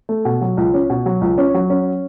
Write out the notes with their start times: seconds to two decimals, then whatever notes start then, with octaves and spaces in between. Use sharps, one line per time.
0.09 A3
0.25 B2
0.41 F#3
0.57 C#2
0.74 C#4
0.90 B2
1.06 F#3
1.21 C#2
1.38 C#4
1.54 F#3
1.70 C#4